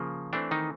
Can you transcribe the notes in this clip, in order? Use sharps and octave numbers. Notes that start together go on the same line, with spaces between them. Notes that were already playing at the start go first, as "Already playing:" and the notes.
Already playing: C#3 F3 A#3
E3 A3 C4 D4
D#3 D#4